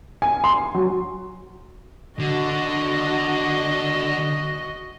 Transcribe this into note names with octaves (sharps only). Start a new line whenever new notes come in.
G#5
C6
F#3
D3 F#4 D#5